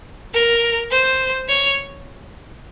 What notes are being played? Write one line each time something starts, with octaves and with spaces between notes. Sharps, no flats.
A#4
C5
C#5